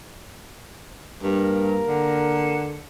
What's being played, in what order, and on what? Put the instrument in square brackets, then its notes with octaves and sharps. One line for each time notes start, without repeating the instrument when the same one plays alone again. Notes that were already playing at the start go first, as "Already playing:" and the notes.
[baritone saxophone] G2 [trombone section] A#3 A#4
[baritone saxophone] D3